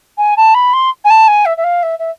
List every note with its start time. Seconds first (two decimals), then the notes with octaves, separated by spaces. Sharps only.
0.18 G#5
0.37 A5
0.54 B5
0.73 C6
1.05 G#5
1.10 A5
1.28 G#5
1.46 E5
1.57 E5
1.64 F5
1.83 E5
1.99 E5